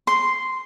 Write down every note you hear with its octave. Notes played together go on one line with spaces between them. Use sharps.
C6